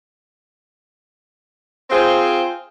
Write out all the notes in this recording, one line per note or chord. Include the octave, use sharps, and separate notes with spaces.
C4 F4 G#4 C5